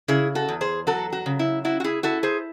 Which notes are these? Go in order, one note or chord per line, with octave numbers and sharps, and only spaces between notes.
C#3 E4 G#4
F#4 A4
E2
G#4 C5
F#3 F#4 A4
F#4
C#3
E4
E4 F#4
F#4
E4 G#4
E4 F#4 A4
G#4 C5